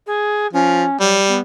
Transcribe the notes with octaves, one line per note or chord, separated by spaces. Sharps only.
G#4
F3 C#4
F#3 G3
B3